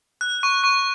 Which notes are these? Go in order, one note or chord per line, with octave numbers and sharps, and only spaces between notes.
F#6
C#6
C#6